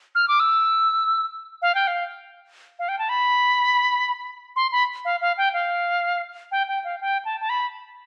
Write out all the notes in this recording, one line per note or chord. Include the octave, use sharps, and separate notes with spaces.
F6
D6
E6
F5
G5
F5
F5
G5
A5
B5
C6
B5
F5
F5
G5
F5
G5
G5
F5
G5
A5
A5
B5